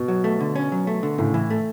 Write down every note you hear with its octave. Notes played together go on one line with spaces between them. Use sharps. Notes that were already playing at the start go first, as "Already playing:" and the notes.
Already playing: B2
F#3
A3
D3
C#4
F#3
A3
D3
A2 C#3
E3
A3